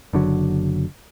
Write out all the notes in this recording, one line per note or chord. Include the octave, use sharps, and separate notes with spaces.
F#1 D3 F#3